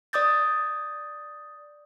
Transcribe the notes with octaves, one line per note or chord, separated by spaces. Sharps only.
D5 D6 D#6 G6 A6